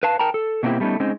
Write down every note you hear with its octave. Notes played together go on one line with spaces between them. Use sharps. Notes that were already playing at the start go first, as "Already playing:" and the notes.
B4 F5 A5
A#4 G5 A5 A#5
A4
B2 A3 A#3 C4 E4 G4
G3 A3 B3 C#4 D#4
G#3 C4 C#4 D#4